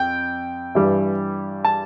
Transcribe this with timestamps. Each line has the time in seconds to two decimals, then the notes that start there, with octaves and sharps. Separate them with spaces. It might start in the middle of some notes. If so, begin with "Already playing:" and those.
Already playing: F2 G5
0.75 G2 E3 G3
1.65 A5